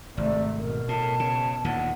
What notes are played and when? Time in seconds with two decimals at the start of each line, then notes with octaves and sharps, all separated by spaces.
0.17 G#1 C3 A3 D5
0.57 B2 A#4
0.88 A2 A5
1.20 C#3
1.65 D#2 A#2 D3 F#5